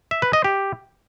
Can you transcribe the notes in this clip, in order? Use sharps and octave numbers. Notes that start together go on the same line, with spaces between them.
E5
B4
D#5
G4